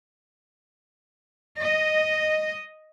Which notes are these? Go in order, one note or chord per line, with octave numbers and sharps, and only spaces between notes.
D#5